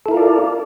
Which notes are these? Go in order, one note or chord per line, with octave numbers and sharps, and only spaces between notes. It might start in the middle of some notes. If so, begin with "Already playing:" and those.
E4 F4 A4 A#4 D5